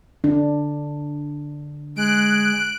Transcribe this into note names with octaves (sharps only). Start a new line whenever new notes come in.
D3 D4
G#3 F#6 D7